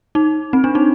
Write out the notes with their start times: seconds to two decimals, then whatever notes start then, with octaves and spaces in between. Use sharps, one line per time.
0.15 D#4
0.53 C4
0.64 D4
0.75 D#4